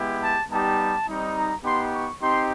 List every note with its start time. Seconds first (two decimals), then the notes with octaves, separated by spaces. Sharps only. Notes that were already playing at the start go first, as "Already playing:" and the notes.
Already playing: G#3 B3 E4 G4
0.21 A5
0.49 G3 B3 D#4 G4 A5
1.07 G3 C4 D#4
1.35 A#5
1.64 B3 D#4 G4 C6
1.93 C#6
2.21 C4 D#4 G4 C6